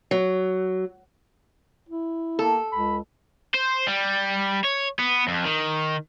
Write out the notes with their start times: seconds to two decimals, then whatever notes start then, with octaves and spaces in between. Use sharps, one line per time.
0.11 F#3
1.89 E4
2.39 A#3 A4
2.72 C#2 B5
3.54 C5
3.87 G3
4.64 C#5
4.99 B3
5.28 F2
5.45 D#3